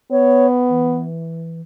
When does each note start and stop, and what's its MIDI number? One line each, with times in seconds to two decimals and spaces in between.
0.11 1.06 59
0.11 0.47 73
0.69 1.61 52